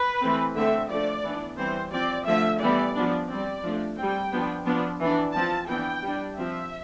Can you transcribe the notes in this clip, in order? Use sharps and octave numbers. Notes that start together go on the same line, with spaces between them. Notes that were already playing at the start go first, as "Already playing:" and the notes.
Already playing: B4
E3 A3 C4
D3 A3 C4 E5
F3 A3 D4 D5
E3 B3 D4
E3 G3 C4 C5
F3 C4 D5
D3 F3 A3 E5
E3 G3 B3 D5
F3 B3 D4
G3 C4 D5
F3 A3 D4
G3 C4 G5
F3 B3 D4
F3 B3 D4
E3 B3 D4
F3 C4 A5
E3 B3 D4 G5
G3 D4
F3 C4 E5